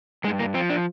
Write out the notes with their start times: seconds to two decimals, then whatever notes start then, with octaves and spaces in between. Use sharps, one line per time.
0.24 G2 G#3
0.39 A#3
0.54 F3 C4
0.70 D4